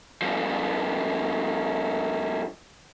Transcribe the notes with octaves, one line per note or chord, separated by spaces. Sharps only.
G2 F3